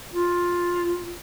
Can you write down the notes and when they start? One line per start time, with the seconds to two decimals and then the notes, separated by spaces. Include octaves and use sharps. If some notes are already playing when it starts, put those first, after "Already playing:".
0.13 F4